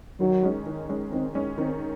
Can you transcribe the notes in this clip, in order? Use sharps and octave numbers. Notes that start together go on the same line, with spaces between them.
D#3 F#3
G#3 C#4
D#3
G#3 C#4
D#3 C4
G#3 C#4
D#3 C4